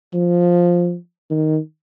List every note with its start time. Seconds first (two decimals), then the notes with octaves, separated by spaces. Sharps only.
0.14 F3
1.30 D#3